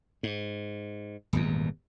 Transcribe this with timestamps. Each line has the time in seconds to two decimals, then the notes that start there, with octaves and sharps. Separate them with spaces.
0.23 G#2
1.33 D#1 G#1 E2